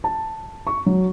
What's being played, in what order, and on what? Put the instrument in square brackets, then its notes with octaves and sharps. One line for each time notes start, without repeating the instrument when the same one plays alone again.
[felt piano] A5
C#6
F#3